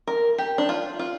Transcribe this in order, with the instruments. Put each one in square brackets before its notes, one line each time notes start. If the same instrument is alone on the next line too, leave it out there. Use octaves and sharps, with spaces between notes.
[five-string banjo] A#4
G4
D4
F4
F4